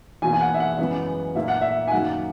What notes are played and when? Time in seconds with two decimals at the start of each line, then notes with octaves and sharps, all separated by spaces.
0.22 E2 B2 A#3 G#5
0.33 G#5
0.41 F#5
0.54 E5
0.60 F#5
0.78 F#2 C#3 E3 G#3 B3
1.35 A#2 A#3 E5
1.48 F#5
1.61 E5
1.88 G#5
1.91 F#2 D#3 F#3 A#3 F#5